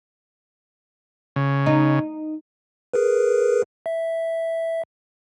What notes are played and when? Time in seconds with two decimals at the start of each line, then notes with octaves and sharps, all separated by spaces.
1.36 C#3
1.66 D#4
2.93 G#4 A#4 B4
3.86 E5